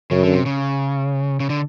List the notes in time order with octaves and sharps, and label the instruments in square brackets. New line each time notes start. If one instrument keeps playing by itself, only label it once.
[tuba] F#2 [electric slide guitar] C#3
[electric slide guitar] D3
C3
C#3
C#3
D3